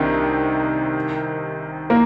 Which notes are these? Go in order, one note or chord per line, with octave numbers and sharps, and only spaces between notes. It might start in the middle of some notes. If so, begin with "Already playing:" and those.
Already playing: C2 C3 D#3 D4
A#3